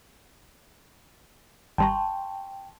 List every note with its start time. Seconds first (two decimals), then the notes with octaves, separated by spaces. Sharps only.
1.78 G#1 G3 G5 A5 A#5 C6 C#6